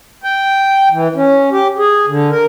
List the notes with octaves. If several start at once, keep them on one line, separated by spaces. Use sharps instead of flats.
G5
E3
C#4
G4
G#4
D3
A#4